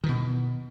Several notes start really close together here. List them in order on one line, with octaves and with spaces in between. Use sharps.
D#3 E3 B2